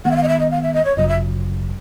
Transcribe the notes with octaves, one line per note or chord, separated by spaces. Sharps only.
D#3 G#3 B3 F#5
E5
F5
D#5
E5
D#5
F5
E5
D#5
C#5
G1 F#2 C#3 F#3 D#5
E5